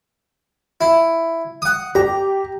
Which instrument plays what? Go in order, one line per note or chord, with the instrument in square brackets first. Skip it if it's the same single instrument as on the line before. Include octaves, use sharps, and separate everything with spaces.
[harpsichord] E4
F#5 D#6
[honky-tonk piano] G4 [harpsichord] A#5